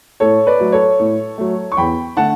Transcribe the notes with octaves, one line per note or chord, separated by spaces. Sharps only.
A2 A4 C#5
B4 D5
F#3 A3
A4 C#5
A2
F#3 A3
C#6
E2 G5 B5
D3 A3 F#5 A5